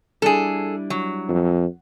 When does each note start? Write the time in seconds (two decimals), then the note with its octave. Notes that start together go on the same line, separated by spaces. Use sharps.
0.22 G3 D4 E4 G#4 A4
0.90 F#3
1.29 F2